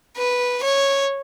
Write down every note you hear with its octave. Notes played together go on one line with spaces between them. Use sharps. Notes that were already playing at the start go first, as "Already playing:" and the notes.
B4
C#5